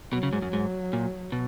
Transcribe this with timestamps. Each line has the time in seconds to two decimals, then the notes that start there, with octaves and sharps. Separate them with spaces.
0.13 B2 F#3
0.23 C#3
0.33 G#2
0.42 F#2
0.53 G#2
0.93 A#2
1.32 B2